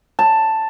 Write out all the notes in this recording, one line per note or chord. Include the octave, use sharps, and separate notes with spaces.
A5